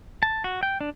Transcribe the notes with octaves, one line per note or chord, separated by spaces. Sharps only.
A5
F#4
G5
D4